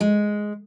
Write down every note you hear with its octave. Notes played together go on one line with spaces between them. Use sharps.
G#3